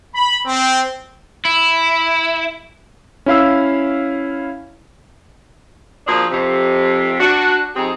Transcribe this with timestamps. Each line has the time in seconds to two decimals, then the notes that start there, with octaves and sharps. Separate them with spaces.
0.15 B5
0.46 C4
1.45 E4
3.26 C#4 E4 F5 E6
6.07 F3 A#3 C4 D4 F#4 G#4
6.31 F2 C3
7.20 D4 F#4
7.76 F2 C4 D#4 G4 G#4